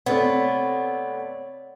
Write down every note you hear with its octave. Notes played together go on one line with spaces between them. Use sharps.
C3 A3 B3 C4 C#5 D5